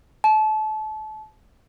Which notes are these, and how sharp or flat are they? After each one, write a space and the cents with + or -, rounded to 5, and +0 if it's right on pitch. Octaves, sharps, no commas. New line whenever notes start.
A5 -30